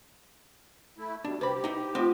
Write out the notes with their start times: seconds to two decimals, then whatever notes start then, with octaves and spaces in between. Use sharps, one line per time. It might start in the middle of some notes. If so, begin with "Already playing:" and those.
0.98 A3 E4
1.25 B2 G3 D4
1.41 C2 G4 B4 C5 B5
1.64 D#4 E4
1.95 A3 C4 F4 D#5